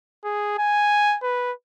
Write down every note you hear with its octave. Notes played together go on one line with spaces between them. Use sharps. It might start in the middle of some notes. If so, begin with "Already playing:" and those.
G#4
G#5
B4